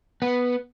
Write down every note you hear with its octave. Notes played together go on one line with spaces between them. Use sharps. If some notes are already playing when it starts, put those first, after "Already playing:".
B3